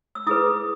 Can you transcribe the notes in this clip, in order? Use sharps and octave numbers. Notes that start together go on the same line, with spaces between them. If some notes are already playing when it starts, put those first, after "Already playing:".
E6
E4 G#4 B4 D#6